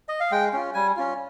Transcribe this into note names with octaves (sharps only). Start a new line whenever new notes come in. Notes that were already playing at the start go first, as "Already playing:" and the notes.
D#5
F5
G#3 G5
C#4 F4
G3 G#5
C#4 F4